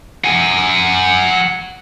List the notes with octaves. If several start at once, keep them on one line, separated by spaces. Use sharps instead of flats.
F#5 G#5